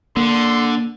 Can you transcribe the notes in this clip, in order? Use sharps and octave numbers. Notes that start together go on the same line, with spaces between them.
D3 A#3 C6